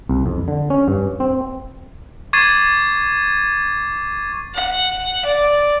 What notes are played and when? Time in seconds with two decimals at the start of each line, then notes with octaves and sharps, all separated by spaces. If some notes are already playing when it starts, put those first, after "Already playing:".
0.09 C2
0.26 F2
0.48 D3
0.70 C#4
0.88 G2
1.20 C4
2.33 C#6 D6 G#6 A6 C7 D#7
4.54 F#5
5.25 D5